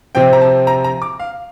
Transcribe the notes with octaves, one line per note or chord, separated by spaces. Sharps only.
C3 F3 C4 G5
A#5
A5
A#5
A#5
D6
F5